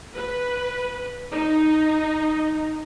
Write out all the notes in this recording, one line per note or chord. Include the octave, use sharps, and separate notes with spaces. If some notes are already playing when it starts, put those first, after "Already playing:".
B4
D#4